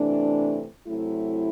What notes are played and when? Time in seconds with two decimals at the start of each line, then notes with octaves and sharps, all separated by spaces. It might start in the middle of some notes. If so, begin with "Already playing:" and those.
Already playing: C3 E3 A3 D4
0.87 C3 F#3 A3 E4